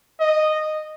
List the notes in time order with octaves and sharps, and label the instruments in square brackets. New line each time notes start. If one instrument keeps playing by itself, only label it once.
[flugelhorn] D#5